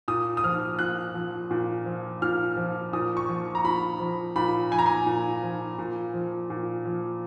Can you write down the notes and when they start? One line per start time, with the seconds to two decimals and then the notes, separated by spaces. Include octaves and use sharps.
0.08 A#2 D#6
0.37 D#6
0.44 F3 F6
0.79 A#2 F#6
1.15 F3
1.51 A#2
1.86 F3
2.22 A#2 F6
2.57 F3
2.93 A#2 D#6
3.17 C#6
3.29 F3
3.55 A#5
3.64 A#2 B5
4.00 F3
4.36 A#2 B5
4.72 F3 G#5
4.79 A#5
4.86 G#5
5.06 A#2
5.43 F3
5.78 A#2
6.14 F3
6.50 A#2
6.85 F3